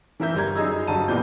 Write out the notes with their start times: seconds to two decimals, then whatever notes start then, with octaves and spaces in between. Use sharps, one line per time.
0.20 E3 A#4 E5 G6
0.34 G1 G3 A#5 G#6
0.55 F#2 D#4 G#4 D#5 A#5 E6
0.87 G1 G2 F#4 A5 A#5 D#7
1.08 A1 A#2 G3 A#3 B3 G6